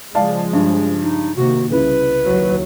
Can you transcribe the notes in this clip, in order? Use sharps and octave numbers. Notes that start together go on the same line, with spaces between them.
C#3 F3 G#3 D5 F5 A5
G2
D#4
C3 D#3 A#3 F#4
C2 C#3 E4 B4
D#2 F#3